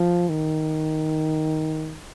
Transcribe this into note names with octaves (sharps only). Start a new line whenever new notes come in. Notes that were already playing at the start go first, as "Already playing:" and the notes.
Already playing: F3
D#3